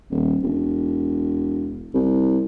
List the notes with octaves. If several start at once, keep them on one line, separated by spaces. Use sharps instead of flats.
D#1
E1
C2